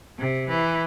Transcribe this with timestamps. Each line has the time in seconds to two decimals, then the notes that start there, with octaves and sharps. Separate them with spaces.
0.19 C3
0.49 E3